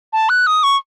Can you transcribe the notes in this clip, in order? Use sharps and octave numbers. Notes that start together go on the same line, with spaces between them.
A5
F#6
D#6
C#6